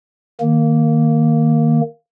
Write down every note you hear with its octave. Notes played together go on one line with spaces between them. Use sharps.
D#3 A#3